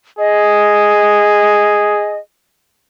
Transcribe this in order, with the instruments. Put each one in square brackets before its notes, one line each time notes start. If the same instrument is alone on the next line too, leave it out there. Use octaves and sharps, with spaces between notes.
[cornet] G#4 [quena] D#5